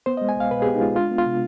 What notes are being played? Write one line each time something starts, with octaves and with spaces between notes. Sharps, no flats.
B3 C5
G#3 D#5
G#5
C2 F5
B2 B4
G#4
B3 G4
D#4
G#3 F4
D4 F4
B3
F4
C3